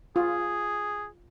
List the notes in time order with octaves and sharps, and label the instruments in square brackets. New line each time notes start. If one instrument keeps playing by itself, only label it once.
[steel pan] F4 [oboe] G#4